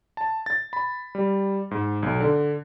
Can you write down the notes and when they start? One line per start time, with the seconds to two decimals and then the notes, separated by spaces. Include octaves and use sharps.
0.17 A5
0.46 A6
0.73 B5
1.15 G3
1.71 G#2
2.03 B1
2.20 D3